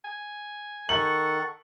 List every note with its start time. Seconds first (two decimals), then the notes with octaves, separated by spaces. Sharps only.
0.05 G#5
0.89 D#3 A4 A#4 F#5 C#6 F6 F#7